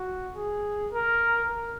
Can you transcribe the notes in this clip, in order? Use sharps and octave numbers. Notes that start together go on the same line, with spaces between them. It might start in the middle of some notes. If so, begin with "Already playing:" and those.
Already playing: F#4
G#4
A#4
A#4